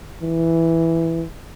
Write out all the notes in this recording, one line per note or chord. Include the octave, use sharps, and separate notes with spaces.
E3